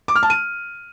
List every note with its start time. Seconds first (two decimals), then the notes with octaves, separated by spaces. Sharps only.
0.08 D6
0.15 F6
0.23 A5
0.30 D#7